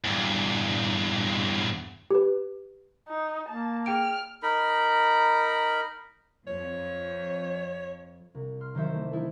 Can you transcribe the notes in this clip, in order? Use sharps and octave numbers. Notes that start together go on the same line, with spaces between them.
E2 G2
G4 B4
D#4
A#3 A5
G#4 G5 F6 D7
D#4 A#4 B5
F2 C#5
C2
C6 F6
D#3 F#3 C5 E5
E3 A3
D#4 E4 A4